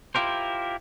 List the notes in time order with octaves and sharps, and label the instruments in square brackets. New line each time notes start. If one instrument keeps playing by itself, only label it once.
[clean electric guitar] E4 F4 G4 A#4 C5